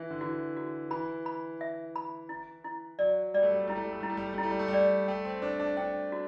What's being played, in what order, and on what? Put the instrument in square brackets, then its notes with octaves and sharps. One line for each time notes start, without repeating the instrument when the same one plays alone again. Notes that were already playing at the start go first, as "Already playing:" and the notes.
Already playing: [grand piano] E3 [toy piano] E5
[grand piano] D3
[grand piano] E3 [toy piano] F#4
[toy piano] F#4
[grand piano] E3 [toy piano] B5
[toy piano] B5
E5
B5
E4
E4
[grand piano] F#3 [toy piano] D5
[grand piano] G3 [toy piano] D5
[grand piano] A3
G3
A3
[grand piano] G3 [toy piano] E4
[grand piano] A3
G3
A3
[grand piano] G3 [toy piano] E4
[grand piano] A3
G3
A3
G3
[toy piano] E4
[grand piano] A3
G3
A3
G3
[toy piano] D5
[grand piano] A3 [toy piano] G5
[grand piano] C4
[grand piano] D4 [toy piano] C5
[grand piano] D4
[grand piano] D4 [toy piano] G5
[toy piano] F#4